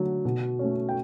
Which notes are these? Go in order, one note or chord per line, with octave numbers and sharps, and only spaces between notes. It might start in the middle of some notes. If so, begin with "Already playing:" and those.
Already playing: D3 F#3 A3
B2
A3 C#4
G5